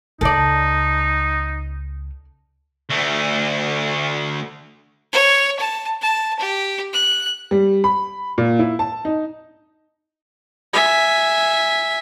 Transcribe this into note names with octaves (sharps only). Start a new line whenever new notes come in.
C#2 C#3 D#4 A4 D5
D2 A3
C#5
A5
A5
G4
F#6
G3
B5
A#2
E4
A5
D#4
E5 G#5